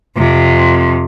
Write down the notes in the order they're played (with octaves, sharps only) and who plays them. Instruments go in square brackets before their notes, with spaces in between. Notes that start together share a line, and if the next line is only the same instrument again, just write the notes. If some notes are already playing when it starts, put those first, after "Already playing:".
[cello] F2 C3